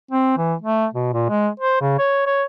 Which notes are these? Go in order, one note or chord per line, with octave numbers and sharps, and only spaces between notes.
C4
E3
A3
B2
A#2
G#3
C5
C#3
C#5
C#5